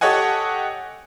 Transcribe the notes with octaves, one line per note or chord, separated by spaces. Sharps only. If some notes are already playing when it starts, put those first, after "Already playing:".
G4 A4 C#5 D#5 F#5 G#5